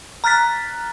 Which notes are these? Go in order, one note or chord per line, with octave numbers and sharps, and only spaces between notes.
A#5 F6 F#6 A6 B6